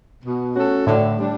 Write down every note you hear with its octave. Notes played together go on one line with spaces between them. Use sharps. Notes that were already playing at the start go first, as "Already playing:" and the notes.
B2
A3 C#4 F#4 A4
A2 D3
G3 D4